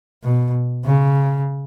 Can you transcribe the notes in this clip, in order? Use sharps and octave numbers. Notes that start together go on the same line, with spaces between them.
B2
C#3